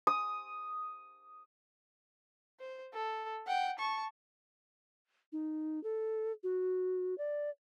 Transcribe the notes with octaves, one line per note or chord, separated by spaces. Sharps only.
D#6
C5
A4
F#5 G5
A5 C#6
D#4
A4
F#4
D5